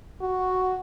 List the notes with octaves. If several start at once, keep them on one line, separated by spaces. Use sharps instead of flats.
F#4